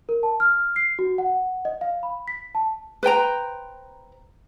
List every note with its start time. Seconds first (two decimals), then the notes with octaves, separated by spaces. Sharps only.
0.09 A#4
0.23 A5
0.40 F6
0.76 C7
0.99 F#4
1.18 F#5
1.65 D#5
1.81 F5
2.03 B5
2.28 B6
2.55 A5
3.03 B4 C5 G5 A#5